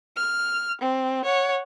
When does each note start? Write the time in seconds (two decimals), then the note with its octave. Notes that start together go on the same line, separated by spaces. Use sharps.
0.17 F6
0.82 C4
1.25 C#5 F#5